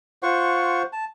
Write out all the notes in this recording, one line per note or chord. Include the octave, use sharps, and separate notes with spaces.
F4 C5 F#5 C#6
A5